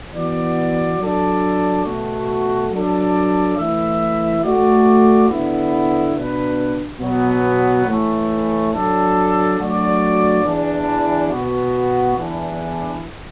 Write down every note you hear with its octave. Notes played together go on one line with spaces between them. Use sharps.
E3 B3 F#4 D5
F#3 D4 A4 D5
B2 A3 F#4
F#3 D4 A4 D5
E3 A3 E4 B4 E5
A3 F#4 D5
D3 B3 E4
B2 B3 D4 B4
B2 F#3 B3
A2 E3 A3
F#3 D4 A4
F#3 A3 D4 F#4 D5
E2 E3 D4
B2 B3 F#4
E2 E3 D4